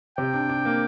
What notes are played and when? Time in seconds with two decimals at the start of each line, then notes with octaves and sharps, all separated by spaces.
0.18 C3 G5
0.33 D4
0.49 D4
0.65 A#3